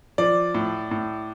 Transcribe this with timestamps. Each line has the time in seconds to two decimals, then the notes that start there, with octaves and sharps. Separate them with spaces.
0.18 F3 D5
0.55 A2
0.91 A2